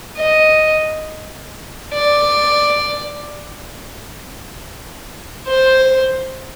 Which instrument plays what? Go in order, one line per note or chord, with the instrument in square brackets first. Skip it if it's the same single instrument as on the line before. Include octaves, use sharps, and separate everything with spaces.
[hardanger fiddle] D#5
D5
C5